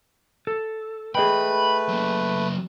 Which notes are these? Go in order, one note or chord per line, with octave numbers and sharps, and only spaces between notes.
A4
A3 G#4 B4 D#5 G5 B5
F#3 A#3